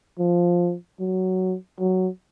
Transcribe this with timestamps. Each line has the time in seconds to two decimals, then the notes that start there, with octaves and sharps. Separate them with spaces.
0.19 F3
1.00 F#3
1.80 F#3